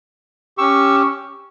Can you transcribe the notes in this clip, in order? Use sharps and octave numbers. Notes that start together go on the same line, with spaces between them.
C#4 G4 C#6 E6